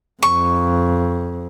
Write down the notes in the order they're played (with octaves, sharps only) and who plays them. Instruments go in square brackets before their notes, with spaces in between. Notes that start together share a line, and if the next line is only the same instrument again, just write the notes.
[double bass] F2 [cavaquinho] C#6